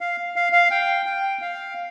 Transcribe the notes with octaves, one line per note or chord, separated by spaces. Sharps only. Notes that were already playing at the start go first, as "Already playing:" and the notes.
F5
F5
F5
G5
G5
F5